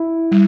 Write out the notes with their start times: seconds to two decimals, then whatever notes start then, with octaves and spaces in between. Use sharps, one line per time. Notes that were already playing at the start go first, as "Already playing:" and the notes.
Already playing: E4
0.32 G3